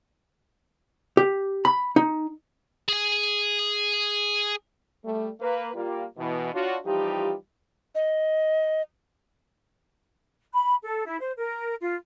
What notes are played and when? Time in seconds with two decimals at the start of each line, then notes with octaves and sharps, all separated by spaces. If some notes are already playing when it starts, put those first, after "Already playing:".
1.17 G4
1.65 B5
1.96 D#4
2.88 G#4 G#5
5.05 G3 A3
5.40 A#3 B4
5.74 G3 A#3 F4
6.18 B2 E3
6.54 D4 F4 F#4 C#5
6.85 E3 F3 G3 D#4 F4 G4
7.95 D#5
10.54 B5
10.83 A4
11.05 E4
11.20 C5
11.36 A#4
11.81 F4